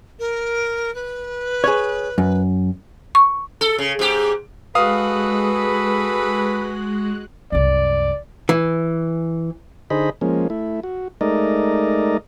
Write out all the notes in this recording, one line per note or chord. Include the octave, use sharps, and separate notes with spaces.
A#4
B4
G#4 C#5
F#2
C#6
A4
C#3
G#2 G4
G#3 F#4 G#4 A4 B4 F5 D#6 F#6
C2 F#2 D5
E3
D3 D#4 G#4 C5 D#5 B5
F3 G#3 A#3 C#4
A3 E4
F#4
G#3 A3 D#4 A#4 D5 D#5